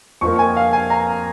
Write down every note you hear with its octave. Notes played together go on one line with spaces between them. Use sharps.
F2 F3 A#3 C#6
G#5
F5
G#5
A#5